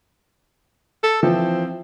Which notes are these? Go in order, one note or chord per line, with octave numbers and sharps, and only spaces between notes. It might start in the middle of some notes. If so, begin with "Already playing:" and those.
A4
E3 F3 C4 E4